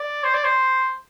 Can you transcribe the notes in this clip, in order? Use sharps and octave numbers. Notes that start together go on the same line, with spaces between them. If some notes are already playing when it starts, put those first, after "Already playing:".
Already playing: D5
C5
D5
C5